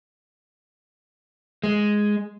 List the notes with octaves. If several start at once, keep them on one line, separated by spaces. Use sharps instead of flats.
G#3